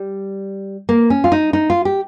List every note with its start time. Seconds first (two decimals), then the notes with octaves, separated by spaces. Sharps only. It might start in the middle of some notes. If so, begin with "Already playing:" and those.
Already playing: G3
0.89 A#3
1.10 C#4
1.24 F4
1.32 D#4
1.53 D#4
1.70 F4
1.85 G4